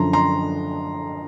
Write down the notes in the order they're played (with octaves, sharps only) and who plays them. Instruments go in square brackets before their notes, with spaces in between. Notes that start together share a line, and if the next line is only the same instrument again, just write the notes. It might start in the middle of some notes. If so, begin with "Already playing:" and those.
Already playing: [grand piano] F#2 D3 F3 [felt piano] A#5 C6
[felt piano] A#5 C6